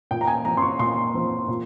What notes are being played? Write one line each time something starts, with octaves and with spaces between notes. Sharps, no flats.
A#2 G5
A#5
G#5
F3 C4 A#5
C6
C#6
A#2 C6
F3 C4
A#2